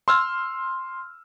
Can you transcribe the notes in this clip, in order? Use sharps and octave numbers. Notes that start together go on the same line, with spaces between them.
C6 E6 F6